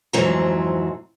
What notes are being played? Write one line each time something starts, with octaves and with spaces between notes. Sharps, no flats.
F2 G#2 E3 F#3 C4 A#5